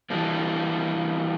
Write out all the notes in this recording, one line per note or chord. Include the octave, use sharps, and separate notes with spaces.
E3 G3 A#3 D4